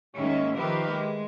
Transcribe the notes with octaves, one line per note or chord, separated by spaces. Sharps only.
D#2 D#3 G#3 C#4 E5
D#3 F3 G4 A#4 B4 E5
G#3